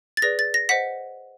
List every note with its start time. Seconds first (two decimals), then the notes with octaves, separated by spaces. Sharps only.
0.17 A6
0.22 G#4 B4 D5 A#6
0.39 A6
0.54 A#6
0.69 C5 D#5 F#5 B6